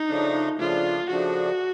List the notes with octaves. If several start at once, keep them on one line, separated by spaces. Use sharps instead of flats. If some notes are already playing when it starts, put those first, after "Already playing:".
Already playing: D#4
C#3 F3 A3 D4
C#3 F3 A3 D4 F4
C#3 F3 A3 D4 F#4